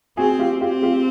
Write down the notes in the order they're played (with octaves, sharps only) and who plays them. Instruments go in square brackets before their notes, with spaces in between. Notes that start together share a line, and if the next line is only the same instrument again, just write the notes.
[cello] C4 [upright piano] F#4 G#4
[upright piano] F4 G4
[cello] C4 [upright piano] F4 G4
[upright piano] F4 G4